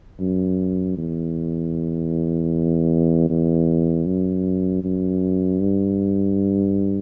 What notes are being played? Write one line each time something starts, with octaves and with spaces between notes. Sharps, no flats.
F#2
E2
E2
F#2
F#2
G2